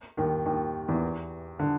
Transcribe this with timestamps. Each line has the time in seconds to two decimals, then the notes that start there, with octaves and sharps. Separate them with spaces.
0.17 D#2 D#3
0.46 D#2 D#3
0.88 E2 E3
1.59 D3